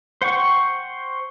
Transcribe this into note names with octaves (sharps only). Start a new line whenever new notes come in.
C5 F#5 G5 C#6